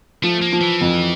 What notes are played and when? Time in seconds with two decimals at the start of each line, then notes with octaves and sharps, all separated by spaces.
0.23 F3 A3
0.42 A#3
0.52 F3
0.61 E3
0.81 F2